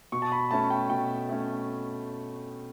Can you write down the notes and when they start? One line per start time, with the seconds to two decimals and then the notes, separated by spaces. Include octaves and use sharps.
0.12 B2 C#6
0.22 A5
0.32 B5
0.51 A3 C#4 A5
0.70 G5
0.90 B2 G5
1.29 A3 C#4